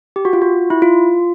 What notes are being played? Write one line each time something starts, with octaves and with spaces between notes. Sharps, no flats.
G4
F#4
F4
F#4
E4
F4